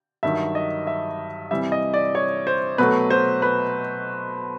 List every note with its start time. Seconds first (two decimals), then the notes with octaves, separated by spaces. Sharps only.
0.23 G2 D#3 F#3 E5
0.55 D#5
0.87 E5
1.51 C3 E3 G3 E5
1.72 D#5
1.94 D5
2.15 C#5
2.47 C5
2.78 B2 F#3 A3 B4
3.10 C5
3.42 B4